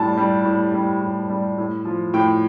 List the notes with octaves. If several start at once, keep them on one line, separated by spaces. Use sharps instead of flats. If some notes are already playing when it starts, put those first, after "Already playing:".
Already playing: A2 G3 A5
G3
A2
G3
A2
G3
A2
F3
A2 G5